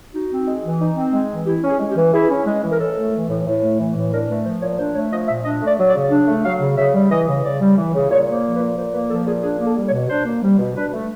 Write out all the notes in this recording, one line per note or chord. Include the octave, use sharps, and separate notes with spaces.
D#4 F#4
C4
G#3
E3
D#4
C4
G#3
E3
E4 G4
C#4
G#4
G#3
G4
E3
E4 G#4
C#4
G#3
E3
A#4
A2 A4
A3
E3
A2
A2
A3
E3
A2
D4 A#4
A3 B4
F3 C5
A#2 C#5
D4 C5
A3 C#5
F3 D#5
A#2 E5
D4 D#5
A3
D5
F#3
D5
C#3
D4
A3
F#3 F5
C#3
C#3 E5
G3
E3 D#5
C#3
C#3 D5
G3
E3
C#3
A#2 C#5
A#3
C5
F3
B4
A#2
A#2 C5
A#3 B4
F3 A4
A#2 G#4
D4 G#4
A#3
A4
G3
C#5
B2
D4 C5
A#3
G3
B2
D4 B4
A3